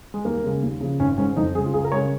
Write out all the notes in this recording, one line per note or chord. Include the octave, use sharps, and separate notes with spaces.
G#3
D#2 A#3
C#3 G#3
D#2
C#3 F3
G#1 C#4
G#2 D#3 G#3 C#4
F2 D#4
C#3 G#3 G#4
F4
C#2 G#4
A#4
C#3 G#3 C#5